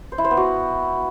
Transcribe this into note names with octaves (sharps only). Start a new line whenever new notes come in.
C5
E4
C5
B3
F#4